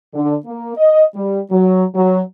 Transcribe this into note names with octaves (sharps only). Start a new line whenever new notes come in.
D3
A#3
D#5
G3
F#3
F#3